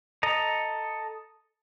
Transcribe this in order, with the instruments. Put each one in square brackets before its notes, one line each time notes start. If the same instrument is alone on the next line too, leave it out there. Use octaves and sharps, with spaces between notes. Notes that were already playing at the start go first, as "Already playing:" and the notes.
[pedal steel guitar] A4 D#5 A#5